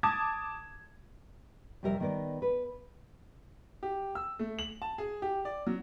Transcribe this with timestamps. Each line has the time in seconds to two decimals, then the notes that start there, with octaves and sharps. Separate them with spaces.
0.03 A5 D6 D#6 G#6
1.83 F2 C3 G3 G4 A#4 E5
2.00 D#3 B3 A#4 B4 D5
2.42 B4
3.83 G4
4.15 E6
4.39 A3
4.59 F#7
4.82 A5
4.98 G#4
5.22 G4
5.45 D5
5.67 F#3